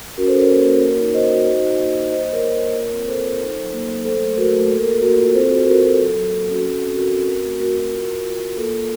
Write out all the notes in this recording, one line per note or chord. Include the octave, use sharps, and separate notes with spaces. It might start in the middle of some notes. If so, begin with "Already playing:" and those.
C#4 F#4 A#4
A4 C5
C#4
A#4 C#5
A#3
A#3
F#4
D#4
F#4 C5 D#5
F#4
D#4
D#4
A#3
F#4
A#3 C5 D#5
C5 D#5
A#3
A#4 C#5
A#3
A#3
F4
C4
C4 A4 C5
F4
D#4
F#3
A#3
F#3
A3 A4 C5
A3
A3 F#4 A#4
A3
A#3 A4
A#4
A#3 A4
A#3 F#4 A#4
F4
C4 A4 C5
F#4
F#4 A#4
F#4 A4
F#3
F#3
A#3
C#4
F#4
F#4 A4
C4
F#4 A#4
C4
F#4 A#4
A3
A3 F#4 A#4
F#4
F4
F4
F4
F4
A#3 A4
A#3